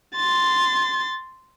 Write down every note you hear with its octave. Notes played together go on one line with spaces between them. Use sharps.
C6 A6